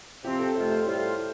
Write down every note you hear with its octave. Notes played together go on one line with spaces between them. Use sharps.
C3 F3 C4 G4
A4
F2 C3 A3 F4 C5
C5
A2 G3 F4
A2